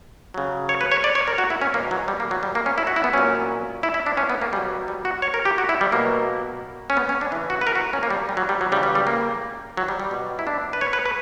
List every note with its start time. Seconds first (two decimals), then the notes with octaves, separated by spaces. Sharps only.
0.34 C#3 F#3
0.69 C#5
0.81 B4
0.91 C#5
1.04 D5
1.15 C#5
1.28 A#4
1.38 F#4
1.50 E4
1.61 C#4
1.74 B2 A#3
1.77 F#3
1.91 F#3
2.08 G3
2.20 A#3
2.31 F#3
2.43 G3
2.55 A#3
2.66 C#4
2.78 E4
2.87 F#4
2.96 E4
3.04 B3
3.13 A#2 F#3 C#4
3.83 E4
3.94 E4
4.06 D4
4.17 C#4
4.30 B3
4.42 A#3
4.53 B2 F#3 G3
4.88 G3
5.05 F#4
5.22 C#5
5.34 A#4
5.45 G4
5.58 F#4
5.69 E4
5.81 G3
5.92 B2 F#3 A#3
6.90 C#4
6.97 B3
7.09 C#4
7.21 D4
7.32 E3 E4
7.35 C#3
7.50 F#4
7.61 B4
7.67 A#4
7.75 F#4
7.93 C#4
8.03 A#3
8.10 G3
8.29 G3
8.37 F#3
8.49 G3
8.61 F#3
8.72 C#3 G3
8.76 E3
8.83 G3
8.95 G3
9.07 A#3
9.77 F#3
9.88 G3
10.00 G3
10.11 B2 F#3
10.39 E4
10.47 D4
10.73 B4
10.81 C#5
10.93 B4
11.05 B4